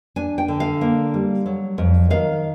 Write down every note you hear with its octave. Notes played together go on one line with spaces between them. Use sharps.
D4 G#5
G5
D3
F5
A#3
G3
F#3
F2
D#3 F5